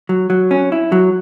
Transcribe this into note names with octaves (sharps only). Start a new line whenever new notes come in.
F#3
F#3
C#4
E4
F#3